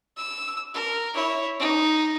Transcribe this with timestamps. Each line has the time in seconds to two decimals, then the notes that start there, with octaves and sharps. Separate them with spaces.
0.17 E6
0.74 A#4
1.14 E4 C#5
1.59 D#4